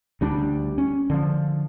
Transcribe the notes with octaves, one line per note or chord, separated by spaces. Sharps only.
D2 G3 D4
C#4
D3 F3